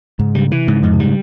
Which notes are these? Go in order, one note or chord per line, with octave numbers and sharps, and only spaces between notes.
G#2 C#3
C#3 G3
C3 E3
G#2 C#3
F2 G#2 F3
C3
C#3 G3